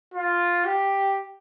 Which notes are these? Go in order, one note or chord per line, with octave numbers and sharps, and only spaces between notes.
F4
G4